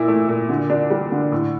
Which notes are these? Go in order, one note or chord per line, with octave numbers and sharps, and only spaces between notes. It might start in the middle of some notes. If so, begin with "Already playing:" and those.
Already playing: A#2 E4
A3
A#2
D3
D4
G3
D3
A2